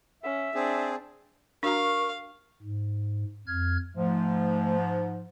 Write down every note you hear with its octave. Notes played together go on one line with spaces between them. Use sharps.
C#4 E5
C4 D4 G#4
D4 F#4 A#4 F5 A#5 C#6
G#2
F2 F6 G#6
G#2 F3 A3